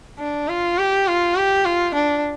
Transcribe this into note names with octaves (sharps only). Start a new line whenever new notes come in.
D4
F4
G4
F4
G4
F4
D4